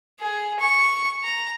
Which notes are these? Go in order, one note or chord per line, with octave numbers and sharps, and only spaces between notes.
G#4
C#6
A#5